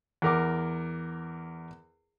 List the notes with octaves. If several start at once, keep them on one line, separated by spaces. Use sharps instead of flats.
E2 A#4 D6